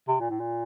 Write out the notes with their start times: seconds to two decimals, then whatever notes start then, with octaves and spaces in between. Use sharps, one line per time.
0.08 C3
0.20 A#2
0.30 A2
0.40 A#2